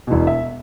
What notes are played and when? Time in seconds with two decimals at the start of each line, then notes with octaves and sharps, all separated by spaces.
0.07 E1 E2 B2
0.27 E5